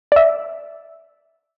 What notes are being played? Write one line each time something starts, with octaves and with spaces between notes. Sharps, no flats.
D5 E5